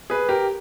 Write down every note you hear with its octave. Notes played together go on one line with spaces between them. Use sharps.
G#4 B4
G4 A#4